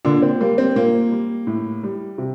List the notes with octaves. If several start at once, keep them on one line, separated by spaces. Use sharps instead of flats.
A#2 D3 D4
C4
G3 A#3
C4
A#2 A#3
G3
A2
G3
C3